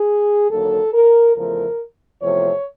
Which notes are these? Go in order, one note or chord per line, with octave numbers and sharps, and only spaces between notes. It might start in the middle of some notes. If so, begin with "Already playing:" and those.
Already playing: G#4
D#2 D3 F#3 A#3 A4
A#4
E2 C#3 F3 A3 A#4
E2 C3 F3 A3 C#5